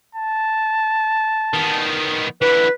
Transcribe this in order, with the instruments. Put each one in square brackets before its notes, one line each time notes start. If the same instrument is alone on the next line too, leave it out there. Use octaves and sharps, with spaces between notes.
[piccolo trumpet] A5
[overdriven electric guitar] D#3 B3
[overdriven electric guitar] D3 E3 [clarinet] B4